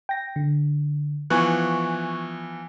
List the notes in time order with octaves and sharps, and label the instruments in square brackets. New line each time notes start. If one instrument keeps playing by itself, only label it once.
[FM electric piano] G5 A#6
D3
[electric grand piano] E3 F3 B3 [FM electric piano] G#5 C#6 F#6